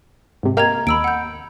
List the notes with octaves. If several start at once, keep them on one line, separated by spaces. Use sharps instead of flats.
G#2 C3
A#3 D#5 F5 G5 A#5 G#6
D#2 B5 E6 D7
F#5 G6